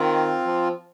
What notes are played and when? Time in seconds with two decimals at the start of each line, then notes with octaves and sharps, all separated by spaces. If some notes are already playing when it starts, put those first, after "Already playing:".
Already playing: D#3 C4 F4
0.46 F3